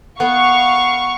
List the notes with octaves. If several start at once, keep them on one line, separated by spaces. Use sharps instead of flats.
B3 F5 C#6